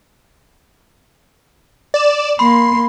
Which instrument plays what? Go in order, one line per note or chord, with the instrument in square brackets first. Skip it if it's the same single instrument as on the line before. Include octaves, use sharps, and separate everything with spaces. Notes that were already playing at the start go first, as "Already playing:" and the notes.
[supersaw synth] D5 E7
[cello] A#3 [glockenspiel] B5 [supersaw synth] C6